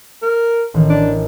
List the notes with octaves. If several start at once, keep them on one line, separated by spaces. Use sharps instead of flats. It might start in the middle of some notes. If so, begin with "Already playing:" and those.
A#4
A1 D#3
D4